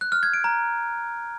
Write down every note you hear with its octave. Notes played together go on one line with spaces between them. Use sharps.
F#6
F6
G#6
D7
A#5